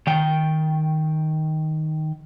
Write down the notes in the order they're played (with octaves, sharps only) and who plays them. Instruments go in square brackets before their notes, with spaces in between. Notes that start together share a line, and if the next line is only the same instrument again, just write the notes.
[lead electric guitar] D#3 G5